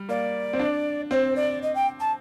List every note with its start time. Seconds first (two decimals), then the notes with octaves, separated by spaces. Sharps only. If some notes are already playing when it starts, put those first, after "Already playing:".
Already playing: G3
0.09 A#3 D5
0.53 C4
0.60 D4
1.10 C4 C5 D5
1.35 D5
1.62 D#5
1.74 G5
1.99 A5